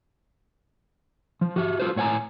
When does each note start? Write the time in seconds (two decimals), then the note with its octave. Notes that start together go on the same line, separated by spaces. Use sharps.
1.41 F3
1.56 F#4 G4 E5
1.79 F4 F#4 A4 C5
1.96 A2 C#5 F#5 G#5 A#5